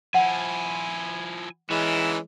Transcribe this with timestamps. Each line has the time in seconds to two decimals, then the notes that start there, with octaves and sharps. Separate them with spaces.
0.14 F3 E4 F#5 G#5
1.70 E3 G#3 B3 C#4 D#4 E4